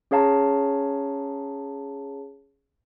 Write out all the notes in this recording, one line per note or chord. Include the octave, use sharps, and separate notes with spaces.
C#4 G#4 C#5 F5 A5 A#5